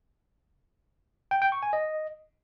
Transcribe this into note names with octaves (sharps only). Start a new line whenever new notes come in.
G5
G5
C#6
G#5
D#5